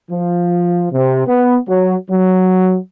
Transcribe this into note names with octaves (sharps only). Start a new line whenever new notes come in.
F3
C3
B3
F#3
F#3